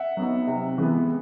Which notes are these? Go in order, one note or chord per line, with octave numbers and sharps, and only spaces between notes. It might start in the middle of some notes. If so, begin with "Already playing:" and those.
Already playing: E5 F#5
F#3 B3 D#4
C3
E3 G#3 B3